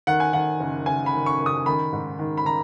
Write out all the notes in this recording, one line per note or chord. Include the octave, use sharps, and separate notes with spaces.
D#3 F#5
G#5
D#3 F#5
F#1
F#1 G#5
B5
D#3
C#6
F#1
D#6
D#3 B5
G#2
D#3
B5
D#3 A#5